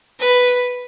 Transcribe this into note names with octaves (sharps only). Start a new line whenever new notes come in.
B4